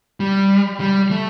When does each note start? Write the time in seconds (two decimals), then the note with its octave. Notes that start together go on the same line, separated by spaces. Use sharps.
0.20 G3
0.80 G3
1.11 A3